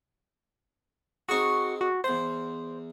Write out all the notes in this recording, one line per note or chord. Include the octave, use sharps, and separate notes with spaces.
C4 D#4 F#4 G#4 C#6
F#4
E2 C5 F#5